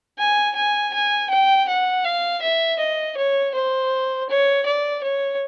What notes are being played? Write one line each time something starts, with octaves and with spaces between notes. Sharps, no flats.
G#5
G#5
G#5
G5
F#5
F5
E5
D#5
C#5
C5
C#5
D5
C#5